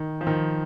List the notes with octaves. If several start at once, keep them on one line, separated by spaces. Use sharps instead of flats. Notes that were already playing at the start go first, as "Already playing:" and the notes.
Already playing: D#3
F3
D#3